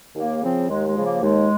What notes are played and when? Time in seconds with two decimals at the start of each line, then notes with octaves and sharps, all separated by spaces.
0.15 D#2 A#3
0.42 C#3 F3 C4
0.69 D#2 G#3
0.86 G#3
0.95 C#3 F3
1.04 A#3
1.22 D#2 G#3